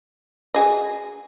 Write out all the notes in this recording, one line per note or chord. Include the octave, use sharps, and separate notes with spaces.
F#4 G#4 D#5